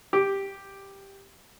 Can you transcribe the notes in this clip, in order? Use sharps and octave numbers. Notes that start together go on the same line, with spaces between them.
G4